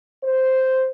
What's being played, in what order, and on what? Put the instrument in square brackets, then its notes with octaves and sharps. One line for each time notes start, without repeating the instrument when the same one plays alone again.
[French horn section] C5